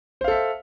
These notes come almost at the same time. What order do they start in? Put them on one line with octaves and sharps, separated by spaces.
C5 F5 A4 E5